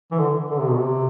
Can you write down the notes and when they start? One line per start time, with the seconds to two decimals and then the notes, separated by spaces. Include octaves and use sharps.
0.11 E3
0.18 D3
0.50 D3
0.59 C3
0.68 B2
0.77 C3